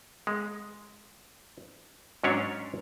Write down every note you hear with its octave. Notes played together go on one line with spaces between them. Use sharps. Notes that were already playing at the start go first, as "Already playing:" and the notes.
G#3
G#2 F#3 C#4 D4 C#5